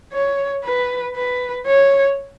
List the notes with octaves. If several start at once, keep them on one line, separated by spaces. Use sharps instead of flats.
C#5
B4
B4
C#5